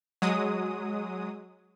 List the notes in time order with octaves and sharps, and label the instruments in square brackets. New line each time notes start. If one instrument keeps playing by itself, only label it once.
[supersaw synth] F#3 G#3 D#6